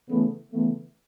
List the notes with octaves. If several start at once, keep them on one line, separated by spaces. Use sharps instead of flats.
C#3 E3 A3 B3
C#3 E3 A3 B3